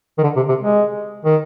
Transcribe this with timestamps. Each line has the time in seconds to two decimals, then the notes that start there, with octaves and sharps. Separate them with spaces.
0.18 D#3
0.23 D3
0.36 C3
0.49 C3
0.60 G#3
1.25 D#3